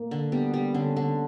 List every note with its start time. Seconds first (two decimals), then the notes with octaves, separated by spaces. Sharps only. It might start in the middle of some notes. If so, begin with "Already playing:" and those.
Already playing: A#3
0.11 D3
0.32 G3 B3
0.54 G3
0.74 D3 C#4
0.96 D3